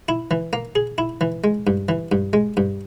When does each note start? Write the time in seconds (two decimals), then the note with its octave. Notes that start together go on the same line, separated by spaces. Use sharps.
0.09 E4
0.31 E3
0.53 A#3
0.75 G#4
0.98 E4
1.21 E3
1.44 G#3
1.67 G2
1.89 E3
2.12 G2
2.33 G#3
2.57 G2